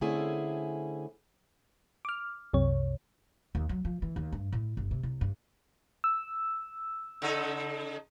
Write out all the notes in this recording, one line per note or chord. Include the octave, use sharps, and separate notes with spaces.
D3 A3 C4 C#4 E4 G#4
D6 F6
C2 F#2 C3 C#5
D#2
F#3
F3
E3
D#2
G2
A2
G1
C3
C2
G2
E6
C#3 D#4 A4